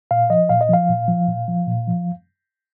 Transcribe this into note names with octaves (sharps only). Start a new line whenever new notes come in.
A#2 F5
F3 D#5
A#2 F5
D#5
F3 F5
A#2
F3
A#2
F3
A#2
F3